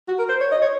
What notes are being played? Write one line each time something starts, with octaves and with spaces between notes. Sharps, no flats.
F#4
A#4
C5
C#5
D#5
C#5